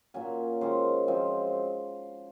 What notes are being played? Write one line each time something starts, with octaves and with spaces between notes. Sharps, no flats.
A#2 F#3 C#4 G#5
F#2 D#3 G#3 C#4 C5
F#2 F3 G#3 C4